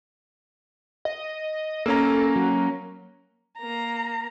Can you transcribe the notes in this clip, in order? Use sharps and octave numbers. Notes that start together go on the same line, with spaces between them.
D#5
A#3 C#4 A4 A#5
F#3
A#3 A#5